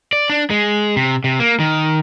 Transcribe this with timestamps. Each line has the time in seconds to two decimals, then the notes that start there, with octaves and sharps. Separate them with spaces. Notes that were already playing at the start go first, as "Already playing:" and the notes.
0.13 D5
0.30 D4
0.50 G#3
0.96 C3
1.24 C3
1.40 A#3
1.60 D#3